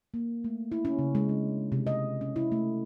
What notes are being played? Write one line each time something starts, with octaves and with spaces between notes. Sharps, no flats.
A#3
A3
E4
C#4
C#3
G#3
D4
C3
D#5
C#4
E4
A3